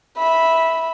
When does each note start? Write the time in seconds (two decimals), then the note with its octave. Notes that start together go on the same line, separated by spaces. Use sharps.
0.17 E5 B5